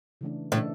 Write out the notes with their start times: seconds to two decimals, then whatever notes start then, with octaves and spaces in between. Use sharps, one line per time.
0.21 C#3 E3 A3 D4
0.52 A2 C#3 E3 A3 D4